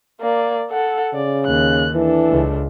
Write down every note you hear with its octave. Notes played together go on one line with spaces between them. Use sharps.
A#3 D5
A4 F#5
C#3 D5
D#2 F#6
E3 D4 A4
C#2